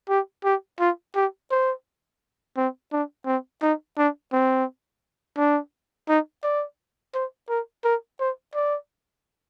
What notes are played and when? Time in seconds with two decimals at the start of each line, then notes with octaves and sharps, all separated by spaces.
0.09 G4
0.44 G4
0.80 F4
1.15 G4
1.51 C5
2.57 C4
2.92 D4
3.26 C4
3.62 D#4
3.97 D4
4.33 C4
5.37 D4
6.09 D#4
6.43 D5
7.14 C5
7.49 A#4
7.85 A#4
8.20 C5
8.55 D5